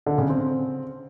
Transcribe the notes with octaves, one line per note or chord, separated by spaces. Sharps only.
D3
C#3
C4